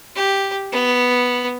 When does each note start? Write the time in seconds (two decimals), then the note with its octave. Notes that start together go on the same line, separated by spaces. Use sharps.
0.16 G4
0.72 B3